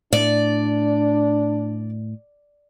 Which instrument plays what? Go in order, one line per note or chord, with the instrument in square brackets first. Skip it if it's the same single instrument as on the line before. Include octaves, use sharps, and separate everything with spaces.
[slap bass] A2 A3 [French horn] D4 [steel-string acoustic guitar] D5